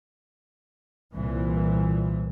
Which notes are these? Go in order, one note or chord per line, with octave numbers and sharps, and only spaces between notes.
C2 A#2 E3